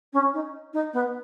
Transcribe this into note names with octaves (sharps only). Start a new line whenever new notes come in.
C#4
D#4
D#4
B3